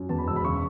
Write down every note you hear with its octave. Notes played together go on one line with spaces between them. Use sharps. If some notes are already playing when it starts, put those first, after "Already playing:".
Already playing: F#2
E2 A5
B5
E1 E6
B5
C#3 C#6